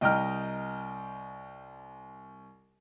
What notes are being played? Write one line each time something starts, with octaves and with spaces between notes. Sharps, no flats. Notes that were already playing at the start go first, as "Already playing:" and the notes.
C2 D#5 G5 A#5 F6